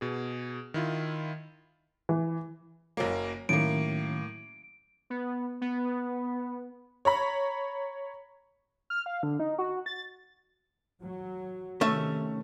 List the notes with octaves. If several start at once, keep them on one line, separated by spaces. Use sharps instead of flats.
B2 G#4
D#3 E4 F4
E3
F#1 F#3 A#3
A2 D#3 F#3 A#3 C#4 D7
B3
B3
C#5 A#5 B5
F6
F5
D3
D#4
F#4
A6
F#3
C3 D#3 A3 C#4 E5